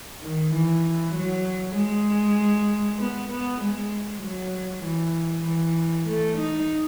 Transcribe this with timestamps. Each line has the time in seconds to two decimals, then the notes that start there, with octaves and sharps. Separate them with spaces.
0.23 D#3
0.53 E3
1.15 F#3
1.76 G#3
2.99 B3
3.30 B3
3.61 G#3
4.23 F#3
4.84 E3
5.46 E3
6.07 A3
6.37 D#4